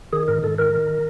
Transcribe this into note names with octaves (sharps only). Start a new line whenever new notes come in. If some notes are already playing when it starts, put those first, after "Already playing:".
D#3 G#4
G#2 A#4
G#2 A4
D#3 A#4
D#3